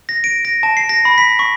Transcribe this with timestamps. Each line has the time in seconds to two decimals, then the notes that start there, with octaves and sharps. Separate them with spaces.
0.09 A#6
0.24 D7
0.45 A#6
0.63 A5
0.77 C7
0.89 A#6
1.05 B5
1.18 B6
1.39 C#6